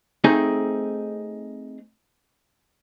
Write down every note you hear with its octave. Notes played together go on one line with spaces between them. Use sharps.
A3 C4 D#4 G#4